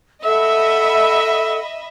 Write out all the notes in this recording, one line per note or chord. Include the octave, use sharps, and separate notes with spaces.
A4 D#5 E5 F#5 B5 E6